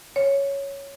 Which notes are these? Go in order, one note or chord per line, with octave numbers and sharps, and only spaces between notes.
C#5